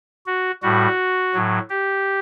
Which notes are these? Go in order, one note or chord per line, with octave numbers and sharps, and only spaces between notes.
F#4
A2 G3 F#4
A2 F#3
G4